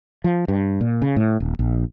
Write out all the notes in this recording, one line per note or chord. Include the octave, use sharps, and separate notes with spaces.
F3
G2
A#2
C#3
A2
D#1
A#1